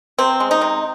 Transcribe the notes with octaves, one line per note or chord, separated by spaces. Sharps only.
C3 C4
G#3
D#4
C3